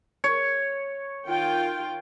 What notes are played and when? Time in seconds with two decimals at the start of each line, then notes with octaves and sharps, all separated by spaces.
0.24 C#5
1.28 D#3 F4 G5